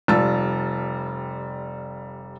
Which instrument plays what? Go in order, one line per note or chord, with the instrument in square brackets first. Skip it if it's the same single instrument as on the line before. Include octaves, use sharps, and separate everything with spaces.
[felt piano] F1 G3 F4 A5 E6 A6